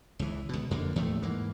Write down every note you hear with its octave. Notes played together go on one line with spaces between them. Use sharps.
C#2 E3
C#2 B2
F2 D3 A#3
D#2 A2 F3 A3
G#2 E3 A#3